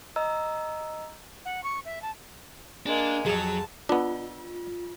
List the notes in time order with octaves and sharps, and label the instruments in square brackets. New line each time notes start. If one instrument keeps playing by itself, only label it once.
[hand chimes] D#5 A#5 E6
[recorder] F#5
C#6
E5
A5
[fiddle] G#3 A#3 [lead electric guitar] D4
[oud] F2 G#4 [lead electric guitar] F#3 [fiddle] A5
[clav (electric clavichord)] B3 D4 [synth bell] F4